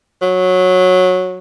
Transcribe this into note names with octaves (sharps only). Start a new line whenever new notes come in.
F#3